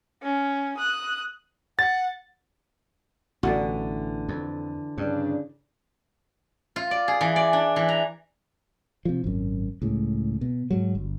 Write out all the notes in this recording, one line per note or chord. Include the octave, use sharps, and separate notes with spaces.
C#4
D#6 F#6
F#5 A6
A1 B2 D3 E3 F#4 D5
F2
G2 C#3 D4
F4
D5
G#4
E3
D5
D4
E3
A#5
C3 F3
G#1 F#2
C#2 A2
B2
G#2 F#3
G1